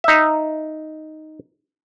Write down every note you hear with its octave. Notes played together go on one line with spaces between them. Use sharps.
D#4 E5